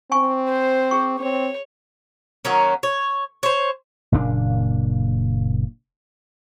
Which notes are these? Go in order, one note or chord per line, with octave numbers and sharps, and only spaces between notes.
C4 G#5 C#6
C5
G#4 C#6
C4 C#5
D#3 F#3 A#3 C#4
C#5
C5 C#5
F#1 A#2 A#3 D4